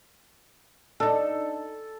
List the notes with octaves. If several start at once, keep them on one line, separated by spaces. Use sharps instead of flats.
D4 D#4 A4